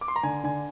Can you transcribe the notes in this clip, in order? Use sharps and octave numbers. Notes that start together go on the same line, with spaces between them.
D6
C6
A#5
D3 G#5
D3 G#5